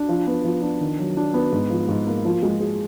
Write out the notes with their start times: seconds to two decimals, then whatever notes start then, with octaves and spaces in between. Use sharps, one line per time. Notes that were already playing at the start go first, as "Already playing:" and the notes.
Already playing: D4
0.09 F3
0.27 B3
0.44 F3
0.62 D4
0.80 D#3
0.99 F#3
1.17 D4
1.34 B3
1.52 G#2
1.70 F3
1.88 G#2
2.07 A#3
2.25 F3
2.43 G#3
2.60 G#4